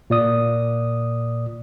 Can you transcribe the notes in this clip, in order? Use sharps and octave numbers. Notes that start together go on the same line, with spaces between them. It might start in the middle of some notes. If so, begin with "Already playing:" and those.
A#2 D5 D#6